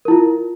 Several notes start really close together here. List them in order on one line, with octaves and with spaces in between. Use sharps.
A#4 E4 F4